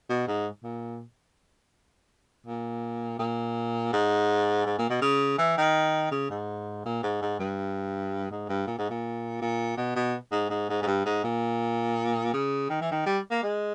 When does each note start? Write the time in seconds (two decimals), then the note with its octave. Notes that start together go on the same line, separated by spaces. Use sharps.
0.09 B2
0.28 G#2
0.64 A#2
2.46 A#2
3.19 A#2
3.93 G#2
4.66 G#2
4.78 A#2
4.90 B2
5.02 C#3
5.38 E3
5.57 D#3
6.11 C#3
6.30 G#2
6.85 A#2
7.03 G#2
7.22 G#2
7.40 G2
8.31 G#2
8.49 G2
8.67 A#2
8.78 G#2
8.90 A#2
9.41 A#2
9.77 B2
9.96 B2
10.32 G#2
10.50 G#2
10.69 G#2
10.82 G#2
10.86 G2
11.06 G#2
11.24 A#2
12.33 C#3
12.70 D#3
12.81 E3
12.91 D#3
13.06 G3
13.31 A#3
13.43 G#3